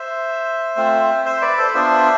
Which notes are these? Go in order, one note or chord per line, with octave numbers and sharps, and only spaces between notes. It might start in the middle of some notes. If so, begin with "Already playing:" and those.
Already playing: C5 E5
A3 C4 F4
C5 E5
B4 D5
A4 C5
D5
B3 D4 F4 C5 E5